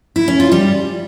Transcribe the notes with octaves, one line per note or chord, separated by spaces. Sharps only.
E4
C#4
F4
G3